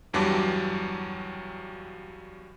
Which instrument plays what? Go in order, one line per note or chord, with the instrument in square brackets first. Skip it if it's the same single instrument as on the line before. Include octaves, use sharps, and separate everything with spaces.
[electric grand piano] E2 G2 F#3 G3 A5 D6